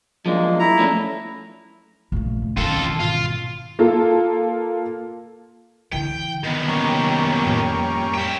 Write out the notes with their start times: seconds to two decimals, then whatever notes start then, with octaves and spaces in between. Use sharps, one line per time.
0.26 F3 F#3 G#3 A#3 D4
0.59 E4 A#5
0.79 A3 C#4 D4
2.12 A#1 G2 C#3 A3
2.57 B2 D#3 E3 G3 C#4 F4 A4
3.00 G#2 B2 F4
3.79 A#3 F4 A4
5.93 D3 E3 G5
6.44 D#3 B3
6.68 G3 A#3 C#4
7.46 F2 A2
8.14 E4 G5